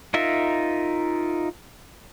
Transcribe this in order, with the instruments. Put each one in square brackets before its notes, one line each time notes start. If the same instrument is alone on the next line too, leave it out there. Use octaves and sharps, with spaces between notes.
[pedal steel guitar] D#4 F4 A#4 E5